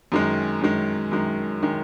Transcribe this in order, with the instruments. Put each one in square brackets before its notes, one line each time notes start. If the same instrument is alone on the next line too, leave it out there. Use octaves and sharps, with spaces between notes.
[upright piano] F#2 D#3 G#3
F#2 D#3 G#3
F#2 D#3 G#3
D#3 G#3